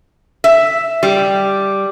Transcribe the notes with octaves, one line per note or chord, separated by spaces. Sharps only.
E5
G3